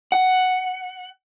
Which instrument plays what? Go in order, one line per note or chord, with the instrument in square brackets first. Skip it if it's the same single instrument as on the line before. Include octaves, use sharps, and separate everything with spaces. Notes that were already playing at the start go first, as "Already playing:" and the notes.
[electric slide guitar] F#5